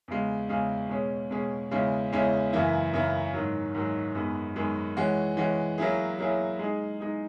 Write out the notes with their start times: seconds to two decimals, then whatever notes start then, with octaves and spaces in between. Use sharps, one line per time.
0.08 E2 C#3 G#3
0.49 E2 C#3 G#3
0.89 B2 G#3 C#4 G#4
1.31 B2 G#3 C#4 G#4
1.71 E2 C#3 G#3 C#4 E4
2.12 E2 C#3 G#3 C#4 E4
2.53 F#2 C#3 E3 A#3 E4
2.94 F#2 C#3 E3 A#3 E4
3.34 G#2 D#3 F#3
3.75 G#2 D#3 F#3
4.15 F#2 D#3 G#3 B3
4.56 F#2 D#3 G#3 B3
4.97 E3 G#3 C#4 F#4
5.37 E3 G#3 C#4 F#4
5.78 F#3 A#3 C#4 E4 G#4
6.19 F#3 A#3 C#4 E4 G#4
6.59 G#3 D#4 G#4
7.00 G#3 D#4 G#4